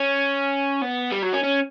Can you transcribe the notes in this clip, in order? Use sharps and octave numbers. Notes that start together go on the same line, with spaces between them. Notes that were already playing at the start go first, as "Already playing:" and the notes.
Already playing: C#4
B3
G3
F#3
C#4
C#4